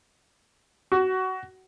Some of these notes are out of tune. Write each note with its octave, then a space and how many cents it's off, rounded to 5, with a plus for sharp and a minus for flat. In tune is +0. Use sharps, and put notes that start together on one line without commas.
F#4 +20